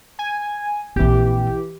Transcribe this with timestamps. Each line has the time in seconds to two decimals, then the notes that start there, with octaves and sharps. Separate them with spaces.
0.19 G#5
0.96 A#1 E3 C4 G4